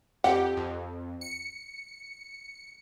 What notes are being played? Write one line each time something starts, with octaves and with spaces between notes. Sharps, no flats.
F2 G4 F#5
F2
C#7